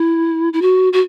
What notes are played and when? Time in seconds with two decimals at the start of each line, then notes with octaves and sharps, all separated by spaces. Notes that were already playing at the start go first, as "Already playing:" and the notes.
Already playing: E4
0.53 E4
0.62 F#4
0.93 F#4